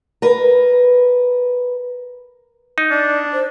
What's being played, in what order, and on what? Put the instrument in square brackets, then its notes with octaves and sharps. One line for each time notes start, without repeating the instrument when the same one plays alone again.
[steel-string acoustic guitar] A#4 B4
[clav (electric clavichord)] D#4
[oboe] D4 [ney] D5
[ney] C5